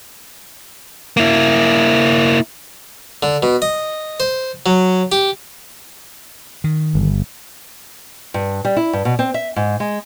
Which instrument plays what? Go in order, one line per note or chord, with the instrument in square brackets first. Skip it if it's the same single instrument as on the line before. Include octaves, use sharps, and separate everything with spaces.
[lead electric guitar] A#3 E4
[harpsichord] D3
B2
D#5
C5
F#3
G4
[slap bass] D#3
[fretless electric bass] G1
[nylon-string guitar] G2
G3
E4
G2
B2
C4
E5
G#2
G#3